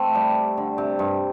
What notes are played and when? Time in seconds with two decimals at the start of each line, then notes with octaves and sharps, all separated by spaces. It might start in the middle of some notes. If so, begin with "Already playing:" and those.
Already playing: A3 C4
0.15 G3
0.57 D3
0.78 C3
0.99 G2